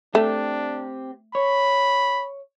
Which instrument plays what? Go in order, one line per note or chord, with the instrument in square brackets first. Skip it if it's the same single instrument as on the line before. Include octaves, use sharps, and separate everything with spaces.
[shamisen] A3 [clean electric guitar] C4 G4 [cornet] D4
[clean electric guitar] C#5 [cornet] B5